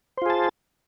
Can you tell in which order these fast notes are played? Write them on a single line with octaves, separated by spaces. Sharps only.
C5 F4 G#4 A5